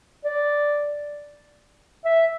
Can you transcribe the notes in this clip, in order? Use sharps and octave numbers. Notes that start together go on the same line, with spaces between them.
D5
E5